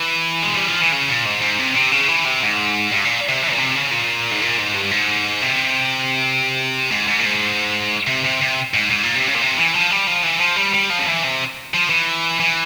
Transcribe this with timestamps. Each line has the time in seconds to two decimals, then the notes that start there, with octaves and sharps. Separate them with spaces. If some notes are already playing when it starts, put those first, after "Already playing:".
Already playing: E3
0.42 G#3
0.55 G3
0.68 F3
0.80 E3
0.92 C#3
1.09 A#2
1.26 G#2
1.42 G#2
1.59 C3
1.76 C3
1.92 C#3
2.08 E3
2.25 C3
2.42 G#2
2.92 G2
3.05 A#2
3.29 C3
3.42 E3
3.52 A#2
3.58 C3
3.75 C#3
3.91 A#2
4.32 G#2
4.42 A#2
4.59 G#2
4.75 G2
4.91 G#2
5.42 C3
6.91 G#2
7.08 G#2
7.19 A#2
7.25 G#2
8.07 C3
8.24 C3
8.42 C3
8.74 G#2
8.91 G#2
9.03 A#2
9.15 C3
9.28 C#3
9.35 A#2
9.41 C3
9.57 E3
9.73 F3
9.91 G3
10.07 F3
10.23 E3
10.40 F3
10.57 G3
10.74 G3
10.90 F3
10.99 C#3
11.06 E3
11.23 C3
11.74 F3
11.90 E3
12.40 E3